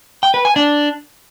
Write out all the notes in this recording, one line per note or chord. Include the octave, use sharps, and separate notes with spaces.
G5
B4
G#5
D4